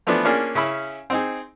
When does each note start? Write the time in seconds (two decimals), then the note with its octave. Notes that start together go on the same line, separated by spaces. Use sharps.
0.07 E3 F3 A3 B3 D4
0.25 A#3 C#4 D4 F4 G#4
0.55 C#3 C#4 E4 B5
1.10 C4 D#4 G#4